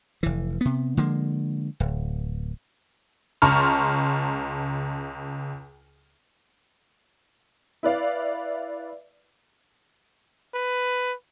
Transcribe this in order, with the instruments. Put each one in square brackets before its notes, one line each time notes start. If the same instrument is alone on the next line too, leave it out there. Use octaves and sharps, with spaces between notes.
[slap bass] F1 E3
C3 B3
D3 F3 G#3 A#3
D1
[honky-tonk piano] C#2 A5 A#5 C6 C#6 F6
E4 B4 D5 F5
[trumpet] B4